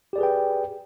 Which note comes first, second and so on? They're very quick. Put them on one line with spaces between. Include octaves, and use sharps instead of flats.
G4 D5 G#4 B4 G5